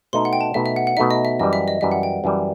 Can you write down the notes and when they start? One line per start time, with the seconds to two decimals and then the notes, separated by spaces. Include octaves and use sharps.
0.13 B2 A3 D#4 C6
0.25 F#5
0.33 G5
0.41 A5
0.54 B2 A3 D#4 E5
0.66 E5
0.76 F#5
0.87 F#5
0.97 B2 A3 D#4 E5
1.11 D#5
1.25 E5
1.39 F#2 E3 G3 D#5
1.53 E5
1.68 D#5
1.81 F#2 E3 G3 E5
1.92 F#5
2.03 G5
2.24 F#2 E3 G3